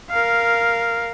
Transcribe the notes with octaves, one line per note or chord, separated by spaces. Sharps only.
A#4 F5